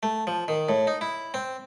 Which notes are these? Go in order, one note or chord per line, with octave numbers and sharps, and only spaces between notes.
A3
F3
D#3
A2
D#4
E4
C4